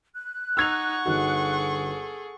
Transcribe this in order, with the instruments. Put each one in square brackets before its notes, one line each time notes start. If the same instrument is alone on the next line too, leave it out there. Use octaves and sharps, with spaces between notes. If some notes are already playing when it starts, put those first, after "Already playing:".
[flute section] F#6
[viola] D#4 [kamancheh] F#5 C#6 [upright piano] E6 G#6 F7
[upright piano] G1 D#4 F#4 [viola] G#4 A4